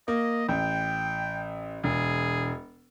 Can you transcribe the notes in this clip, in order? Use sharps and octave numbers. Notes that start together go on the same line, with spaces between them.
A#3 D#5
A1 G5
E1 G#4